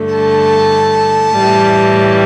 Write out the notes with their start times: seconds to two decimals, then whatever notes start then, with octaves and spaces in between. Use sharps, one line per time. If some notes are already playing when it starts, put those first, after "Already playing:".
Already playing: G2 D3 A3
0.14 A5
1.37 A2 E3 G3